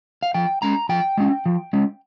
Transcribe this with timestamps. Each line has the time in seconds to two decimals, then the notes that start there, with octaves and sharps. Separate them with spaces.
0.23 F5
0.34 F3 G5
0.62 G#3 C#4 A#5
0.89 F3 G5
1.17 G#3 C#4
1.46 F3
1.73 G#3 C#4